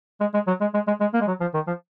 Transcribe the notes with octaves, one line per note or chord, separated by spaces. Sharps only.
G#3
G#3
F#3
G#3
G#3
G#3
G#3
A#3
G#3
F#3
F3
D#3
F3